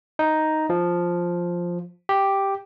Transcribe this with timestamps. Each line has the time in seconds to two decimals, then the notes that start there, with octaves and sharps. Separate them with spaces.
0.19 D#4
0.70 F3
2.09 G4